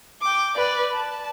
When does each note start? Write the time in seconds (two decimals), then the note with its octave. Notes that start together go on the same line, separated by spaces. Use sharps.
0.21 G5 D6
0.54 B4 D5
0.94 A5